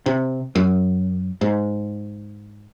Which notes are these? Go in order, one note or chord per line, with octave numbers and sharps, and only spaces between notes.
C3
F#2
G#2